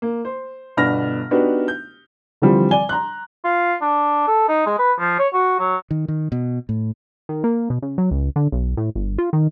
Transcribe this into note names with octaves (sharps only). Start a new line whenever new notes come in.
A#3
C5
G1 B2 D4 B5 F6 A#6
B3 D4 D#4 F#4 G4 B4
G6
D3 E3 F3 G3 C4
D5 G#5 G7
A#5 C6 F#6
F4
D4
A4
D#4
G#3
B4
F3
C#5
F#4
F#3
D#3
D#3
B2
A2
D#3
A#3
B2
C#3
F#3
C#2
D3
B1
A2
G1
F4
D#3